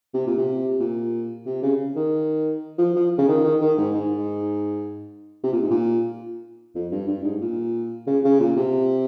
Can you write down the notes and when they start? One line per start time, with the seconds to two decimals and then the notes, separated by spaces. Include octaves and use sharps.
0.14 C3
0.26 A#2
0.38 C3
0.80 A#2
1.46 C3
1.62 C#3
1.96 D#3
2.79 F3
2.95 F3
3.18 C#3
3.28 D#3
3.44 D#3
3.61 D#3
3.78 G#2
3.95 G#2
5.43 C3
5.52 A#2
5.62 G#2
5.71 A#2
6.75 F2
6.92 G2
7.08 G2
7.24 G#2
7.41 A#2
8.07 C#3
8.24 C#3
8.40 A#2
8.57 C3